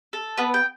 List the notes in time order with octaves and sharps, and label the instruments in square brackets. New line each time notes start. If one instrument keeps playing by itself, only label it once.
[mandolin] A4
B3 B4
G5